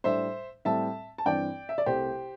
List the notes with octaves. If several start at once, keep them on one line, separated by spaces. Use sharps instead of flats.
A2 G3 D4 C5 E5
A2 G3 C4 E5 A5
A5
G2 E3 C4 D5 G5
E5
D5
C2 C3 A3 C4 G4 C5